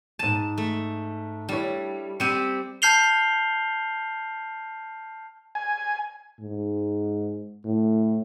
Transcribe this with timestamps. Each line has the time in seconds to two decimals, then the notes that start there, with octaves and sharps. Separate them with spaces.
0.19 G#2 A5 D#7
0.58 A3
1.49 G3 D4 E4 C#5
2.20 G3 C4 G4 C#7 D#7
2.82 A5 F6 G6 C7 F7 G7
5.55 G#5
6.40 G#2
7.65 A2